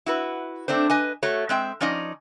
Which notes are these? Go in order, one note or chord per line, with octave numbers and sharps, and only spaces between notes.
E4 F#4 B4
A3 C4 D4 C5
B4 D#5 G#5
A3 F#4 C#5
G#3 C4 E5 G5
F3 C#4 D#4 D5 D#5